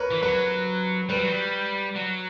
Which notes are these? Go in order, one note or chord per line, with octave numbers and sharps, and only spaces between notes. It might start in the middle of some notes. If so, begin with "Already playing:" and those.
Already playing: A#4 B4 C#5
E3
F#3 B4
G3 B4
F#3
G3
F#3